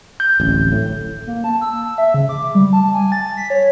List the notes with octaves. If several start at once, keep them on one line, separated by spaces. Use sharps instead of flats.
G6
D1 A1
A2
A#3
A5
E6
E5
C#3
D6
G3
A5
G#5
A6
B6
C#5